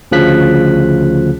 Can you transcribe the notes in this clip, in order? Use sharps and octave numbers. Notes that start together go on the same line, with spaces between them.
D2 C#3 F3 F#6 B6